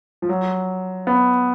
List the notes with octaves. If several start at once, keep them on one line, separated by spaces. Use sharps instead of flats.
F3
F#3
B3